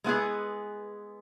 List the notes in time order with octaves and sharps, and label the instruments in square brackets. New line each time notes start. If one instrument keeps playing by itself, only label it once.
[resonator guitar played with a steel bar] G#3 B3 E4 G#4